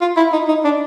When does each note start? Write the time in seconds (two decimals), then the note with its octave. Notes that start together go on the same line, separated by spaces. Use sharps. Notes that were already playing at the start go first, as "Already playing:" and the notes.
0.01 F4
0.17 E4
0.33 D#4
0.48 D#4
0.65 D4